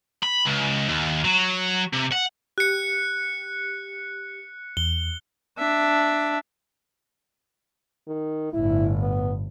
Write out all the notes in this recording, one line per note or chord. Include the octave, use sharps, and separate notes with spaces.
B5
C#2
D#2
F#3
C3
F#5
G4 F#6 C#7
E2 G7
D4 E5
D#3
G1 A2 E4
B3